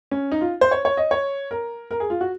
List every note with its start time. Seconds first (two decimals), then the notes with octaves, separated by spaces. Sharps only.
0.11 C#4
0.32 D#4
0.41 F4
0.61 C5
0.71 C#5
0.85 C#5
0.97 D#5
1.11 C#5
1.51 A#4
1.91 A#4
2.00 G#4
2.10 F4
2.21 F#4